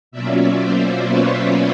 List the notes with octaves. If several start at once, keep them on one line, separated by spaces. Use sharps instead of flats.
B2 F#3 A#3 C#4 F4 D5 E5
C5 D5
B4 C#5